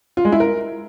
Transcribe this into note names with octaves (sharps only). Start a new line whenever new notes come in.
F4
G#3
E4
A#4